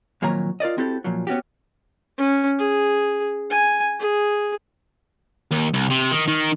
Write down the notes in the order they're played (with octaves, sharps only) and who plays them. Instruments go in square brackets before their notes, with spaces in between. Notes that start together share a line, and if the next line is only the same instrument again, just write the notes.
[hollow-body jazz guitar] F2 A#2 D#3 F#3 C#5 A#5
F4 A#4 D5 D#5
C4 E4 F#4 G4 A4
A#2 F3 F#3
B3 C#4 F#4 G4
[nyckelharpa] C#4
G#4
G#5
G#4
[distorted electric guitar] D#2
C2
C3
D#3
D#3